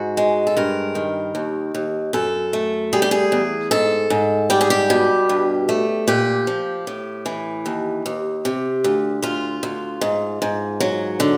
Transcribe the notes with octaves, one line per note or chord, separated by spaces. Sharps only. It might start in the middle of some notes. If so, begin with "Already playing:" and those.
Already playing: G#2 F#4
G#3
A4
G2 A#4
D#3
D#2
D#2
F#2 A4
A3
G3 G#4
G4
G#4
E2
G#2 A4
G#2
G3 G4
G#4
G4
B2
G2
A3
A#2 G4
F3
A2
E3
D#2
D#2
C3
D2
D2 F4
D2
G#2
G#2
F#3
D3